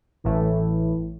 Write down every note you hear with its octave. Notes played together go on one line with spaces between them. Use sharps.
A1 A2 E3 A3 E4